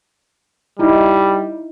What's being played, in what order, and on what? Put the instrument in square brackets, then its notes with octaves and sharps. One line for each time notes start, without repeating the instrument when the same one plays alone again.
[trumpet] G3 [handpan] D#4 E4